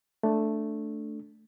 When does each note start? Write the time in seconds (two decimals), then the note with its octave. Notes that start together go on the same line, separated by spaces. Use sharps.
0.23 A3 D4